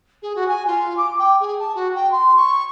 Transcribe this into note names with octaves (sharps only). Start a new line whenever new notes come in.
G#4
F#4
G#5
F4
D6
G5
G#4
A5
F#4
G5
C6
C#6